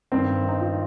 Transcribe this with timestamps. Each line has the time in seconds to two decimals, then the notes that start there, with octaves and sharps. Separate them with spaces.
0.12 G2 D#3 C4
0.48 D#4
0.61 F4